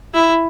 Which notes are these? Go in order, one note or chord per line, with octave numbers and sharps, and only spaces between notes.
E4